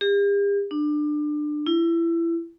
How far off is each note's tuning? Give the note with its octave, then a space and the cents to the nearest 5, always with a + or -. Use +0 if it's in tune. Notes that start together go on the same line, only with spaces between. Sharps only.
G4 +45
D4 +25
E4 +25